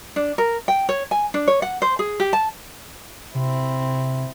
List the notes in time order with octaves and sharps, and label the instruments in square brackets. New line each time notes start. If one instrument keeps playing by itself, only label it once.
[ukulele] D4
A#4
G5
C#5
G#5
D4
C#5
F#5
C5
G#4
G4
A5
[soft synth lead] C3 [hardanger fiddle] C4 E4